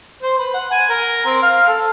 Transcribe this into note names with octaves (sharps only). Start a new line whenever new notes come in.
C5
B4
F#5
G#5
A#4
C4
F5
A4